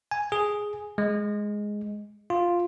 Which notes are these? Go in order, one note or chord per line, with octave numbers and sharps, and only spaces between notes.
G#5
G#4
G#3
F4